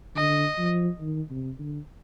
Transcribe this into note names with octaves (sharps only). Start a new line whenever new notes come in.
D3 D#5
F3
D#3
C3
D3